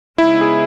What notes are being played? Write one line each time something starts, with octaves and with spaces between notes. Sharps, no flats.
C#3 G#3 B3 D#4 E4
G#4